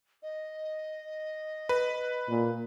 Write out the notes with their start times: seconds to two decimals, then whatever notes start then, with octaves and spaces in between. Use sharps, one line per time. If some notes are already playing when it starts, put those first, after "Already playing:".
0.22 D#5
1.69 B4
2.29 A#2